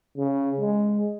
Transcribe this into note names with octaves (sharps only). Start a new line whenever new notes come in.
C#3
G#3